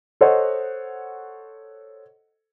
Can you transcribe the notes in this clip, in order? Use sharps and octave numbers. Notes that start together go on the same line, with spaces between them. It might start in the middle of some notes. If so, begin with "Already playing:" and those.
A4 C5 C#5 D#5 F#5